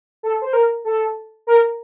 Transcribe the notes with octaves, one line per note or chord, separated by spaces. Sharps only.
A4
C5
A#4
A4
A#4